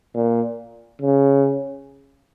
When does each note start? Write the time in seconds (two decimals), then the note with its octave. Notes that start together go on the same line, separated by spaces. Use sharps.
0.15 A#2
1.02 C#3